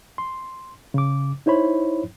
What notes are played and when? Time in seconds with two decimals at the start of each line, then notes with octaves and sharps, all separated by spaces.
0.18 C6
0.94 C#3 D6
1.46 D#4 E4 C5 C#5 B5